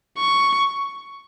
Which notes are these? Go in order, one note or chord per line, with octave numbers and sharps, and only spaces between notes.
C#6